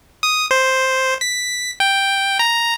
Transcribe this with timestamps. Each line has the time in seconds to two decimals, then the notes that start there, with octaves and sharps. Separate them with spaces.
0.23 D#6
0.51 C5
1.21 B6
1.80 G5
2.39 A#5